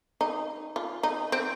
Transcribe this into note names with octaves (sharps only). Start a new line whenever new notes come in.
D#4
F4
D#4
C4